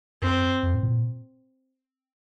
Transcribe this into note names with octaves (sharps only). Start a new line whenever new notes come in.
F#2 C4
F2
A2
A#2